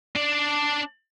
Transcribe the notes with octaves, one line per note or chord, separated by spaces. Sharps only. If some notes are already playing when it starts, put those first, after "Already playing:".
D4 D5